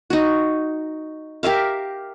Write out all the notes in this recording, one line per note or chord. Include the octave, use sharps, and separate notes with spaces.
D#4 F#4
G4 A#4 E5 F5